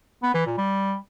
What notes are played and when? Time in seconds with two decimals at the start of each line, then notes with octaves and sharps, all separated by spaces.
0.23 B3
0.35 E3
0.46 A#2
0.58 G3